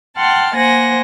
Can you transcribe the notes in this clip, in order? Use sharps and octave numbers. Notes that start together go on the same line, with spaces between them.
F#5 G5 A5 C6 F6
A#3 C5 F#5 G#5 A#6